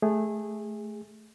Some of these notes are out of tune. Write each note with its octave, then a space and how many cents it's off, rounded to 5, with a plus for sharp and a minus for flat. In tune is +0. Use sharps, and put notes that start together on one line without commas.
A3 -20 G#4 -20